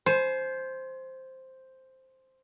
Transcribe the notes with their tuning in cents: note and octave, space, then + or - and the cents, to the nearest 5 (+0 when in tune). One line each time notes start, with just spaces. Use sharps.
C5 +0 G#5 +35